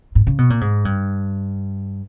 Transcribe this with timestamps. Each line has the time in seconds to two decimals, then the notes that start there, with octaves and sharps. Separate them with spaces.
0.15 G#2
0.27 C#3
0.38 B2
0.50 A#2
0.61 G#2
0.85 G2